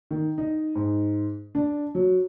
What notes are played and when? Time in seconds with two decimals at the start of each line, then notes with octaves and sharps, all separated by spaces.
0.11 D#3
0.38 D#4
0.75 G#2
1.55 D4
1.95 F#3